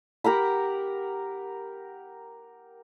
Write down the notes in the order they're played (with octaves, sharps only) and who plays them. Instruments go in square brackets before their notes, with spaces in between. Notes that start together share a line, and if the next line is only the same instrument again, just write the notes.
[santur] G4 A#4 F#5 B5